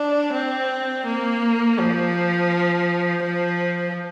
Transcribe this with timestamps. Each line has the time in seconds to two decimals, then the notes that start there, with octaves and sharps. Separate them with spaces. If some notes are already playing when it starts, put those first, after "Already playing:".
Already playing: D4
0.34 C4
1.06 A#3
1.78 F3
3.23 F3